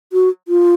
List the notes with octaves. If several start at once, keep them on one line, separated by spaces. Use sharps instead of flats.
F#4
F4